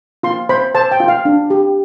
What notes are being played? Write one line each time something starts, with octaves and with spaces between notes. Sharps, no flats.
F4 C6
C5 B5
C5 A5
G5
F4
F5
D4
G4